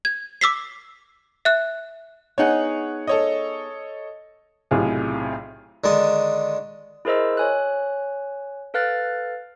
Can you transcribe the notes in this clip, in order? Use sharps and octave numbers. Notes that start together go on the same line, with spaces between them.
G#6
D6 E6 B6 C7
E5 F#6
B3 D#4 G#4 C#5 F#5
A4 C#5 D#5
B1 A2 C3 F4 G#4
D3 D#3 G#3 A5 D#6
E4 G#4 A#4 C5 D#5 E6
C#5 G#5 F#6
A4 B4 F5 F6 F#6 A6